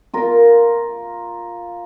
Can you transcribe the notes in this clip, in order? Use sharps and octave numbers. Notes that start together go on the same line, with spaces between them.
F4 A#4